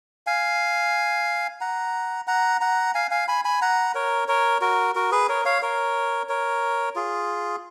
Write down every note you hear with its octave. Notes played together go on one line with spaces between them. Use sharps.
F5 G#5
F#5 A#5
F#5 A#5
F#5 A#5
F5 G#5
F5 G#5
G#5 B5
G#5 B5
F#5 A#5
A#4 C#5
A#4 C#5
F#4 A#4
F#4 A#4
G#4 B4
A#4 C#5
C#5 F5
A#4 C#5
A#4 C#5
F4 G#4